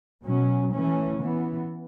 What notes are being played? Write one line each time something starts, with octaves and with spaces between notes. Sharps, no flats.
B2 F#3 C#4
E3 A3 C#4
E3 B3